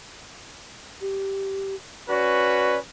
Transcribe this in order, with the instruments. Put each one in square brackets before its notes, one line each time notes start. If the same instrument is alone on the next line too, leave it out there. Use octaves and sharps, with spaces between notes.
[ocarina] G4
[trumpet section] C#4 F#4 B4 [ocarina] D5